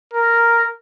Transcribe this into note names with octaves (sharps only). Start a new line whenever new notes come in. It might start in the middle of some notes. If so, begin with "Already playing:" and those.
A#4